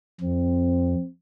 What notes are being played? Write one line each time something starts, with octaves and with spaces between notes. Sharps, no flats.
F2 C4